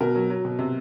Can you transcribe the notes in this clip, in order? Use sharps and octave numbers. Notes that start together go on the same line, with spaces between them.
B2 A#4
F#3
F#3
B2
C3